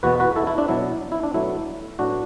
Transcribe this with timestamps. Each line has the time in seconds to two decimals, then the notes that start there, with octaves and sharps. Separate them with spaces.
0.03 E2 B2 B3 F#4 B4
0.20 F#4 B4
0.36 E4 A4
0.47 E4
0.58 D4
0.68 B2 F#3 B3 E4
1.12 E4
1.23 D4
1.34 B2 F#3 A3 E4
1.99 A2 F#3 B3 D4 F#4